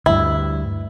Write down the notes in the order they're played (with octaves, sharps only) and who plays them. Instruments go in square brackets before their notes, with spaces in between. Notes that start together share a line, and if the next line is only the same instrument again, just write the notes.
[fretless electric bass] D2 G2 [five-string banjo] E4